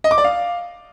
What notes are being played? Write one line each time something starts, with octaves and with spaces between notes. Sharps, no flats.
D#5
D6
D5
F5